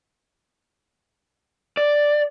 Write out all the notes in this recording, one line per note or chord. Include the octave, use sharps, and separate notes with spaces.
D5